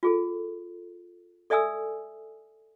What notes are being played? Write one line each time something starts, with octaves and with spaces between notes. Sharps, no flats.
F4 G#4 A4
A4 D5 E5 G#5 D#6 E6